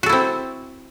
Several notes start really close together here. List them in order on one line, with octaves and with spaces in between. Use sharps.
F#4 A4 E4 C4